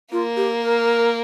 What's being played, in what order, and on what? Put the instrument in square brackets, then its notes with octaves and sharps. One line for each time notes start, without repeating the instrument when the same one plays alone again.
[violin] A#3 [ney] F4
[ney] G4
A#4